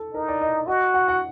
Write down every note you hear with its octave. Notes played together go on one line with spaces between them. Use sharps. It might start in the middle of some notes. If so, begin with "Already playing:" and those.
Already playing: A4
D#4 A#4
D5
D#5
F#4 D#5
F#5
F#5